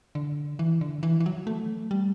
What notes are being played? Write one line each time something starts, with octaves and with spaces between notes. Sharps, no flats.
D3
E3
D3
E3
E3
F#3
A3
G3